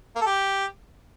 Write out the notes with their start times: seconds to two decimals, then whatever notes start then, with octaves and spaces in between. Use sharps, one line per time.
0.16 A#3
0.21 A4
0.26 G4